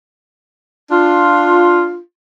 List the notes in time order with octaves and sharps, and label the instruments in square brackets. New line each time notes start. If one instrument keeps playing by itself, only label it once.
[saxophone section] D4 F4